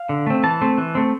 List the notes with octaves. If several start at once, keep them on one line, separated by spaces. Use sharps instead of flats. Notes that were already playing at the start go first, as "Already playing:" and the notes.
Already playing: F5
D3
A3 C4
E3 A5
A3 C4
E3
A3 C4